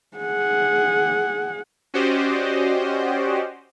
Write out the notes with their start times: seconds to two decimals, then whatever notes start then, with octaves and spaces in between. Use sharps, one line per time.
0.17 G#4 F#5
1.94 C#4 F#4 G4 C5 D5 D#5